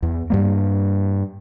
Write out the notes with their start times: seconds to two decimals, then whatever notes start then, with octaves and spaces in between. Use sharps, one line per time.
0.03 E2
0.30 G2 G3 A#3